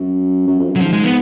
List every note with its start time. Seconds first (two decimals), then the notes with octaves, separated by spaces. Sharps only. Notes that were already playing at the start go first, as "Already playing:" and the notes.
Already playing: F#2
0.47 F#2
0.58 F2
0.70 F#2
0.76 F#3
0.81 G#2 F3
0.93 G#3
1.04 B3